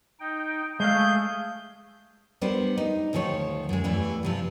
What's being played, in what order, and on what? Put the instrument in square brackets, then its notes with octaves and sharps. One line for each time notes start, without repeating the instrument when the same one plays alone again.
[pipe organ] D#4 G5
[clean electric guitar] G#3 F5 [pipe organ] A3 G#4 [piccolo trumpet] G6
[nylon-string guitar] G3 B3 D4 A#4 C5
D#4
D2 D#3 F3 G#4 C#5
F#2 G#3
E2 G2 E3 G3 A3
G2 C3 F3